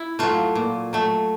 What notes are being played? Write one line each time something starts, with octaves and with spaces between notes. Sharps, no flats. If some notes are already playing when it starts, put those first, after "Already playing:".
Already playing: E4
F#3 A3 F4
A#2
F#3 A3